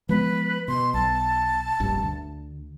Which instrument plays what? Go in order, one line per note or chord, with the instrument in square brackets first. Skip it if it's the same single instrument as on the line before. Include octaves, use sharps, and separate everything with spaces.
[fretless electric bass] F3 G#3 B3 [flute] B4
[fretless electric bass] B2 [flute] C6
[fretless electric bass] B1 [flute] A5
[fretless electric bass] F1 A#1 G2
D2